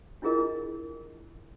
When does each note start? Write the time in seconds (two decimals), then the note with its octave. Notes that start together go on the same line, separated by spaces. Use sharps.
0.22 D4 E4 F4 G#4 A#4 D#5